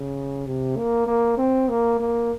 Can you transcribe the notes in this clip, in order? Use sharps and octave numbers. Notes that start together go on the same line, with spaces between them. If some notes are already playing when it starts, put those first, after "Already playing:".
Already playing: C#3
C3
A#3
A#3
C4
A#3
A#3